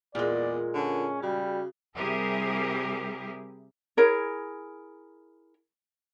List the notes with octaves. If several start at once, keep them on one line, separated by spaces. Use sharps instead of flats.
E2 A#2 G#3 F4 A#4 D5
D3 C#4
C#3 G3 F#4
C3 G3 E4 G4 G#4 A#4
E4 G#4 A#4 C#5